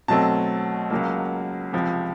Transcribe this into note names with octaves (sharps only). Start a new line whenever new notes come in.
B2 F#3 A3 C4 A5
C#2 C#3 F#3 A#3
C#2 C3 F3